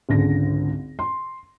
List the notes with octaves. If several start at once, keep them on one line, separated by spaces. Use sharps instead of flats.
G#1 C#2 D3 G#4 A#6
C6